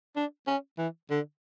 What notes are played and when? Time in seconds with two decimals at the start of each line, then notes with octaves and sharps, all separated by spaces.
0.16 D4
0.47 C#4
0.78 E3
1.10 D3